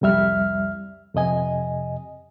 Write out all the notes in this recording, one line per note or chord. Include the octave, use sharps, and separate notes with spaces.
C2 F2 G3 E5 F6
F2 C3 D#5 G#5